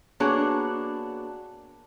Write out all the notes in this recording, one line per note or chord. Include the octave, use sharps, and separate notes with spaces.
A#3 B3 D4 F#4 G#4 C#5